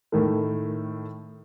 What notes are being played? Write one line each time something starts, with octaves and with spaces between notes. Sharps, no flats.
A2 D#3 A3